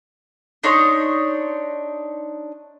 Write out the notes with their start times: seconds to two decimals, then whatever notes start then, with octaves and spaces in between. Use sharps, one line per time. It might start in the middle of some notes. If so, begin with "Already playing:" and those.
0.64 D4 D#4 C#5 C6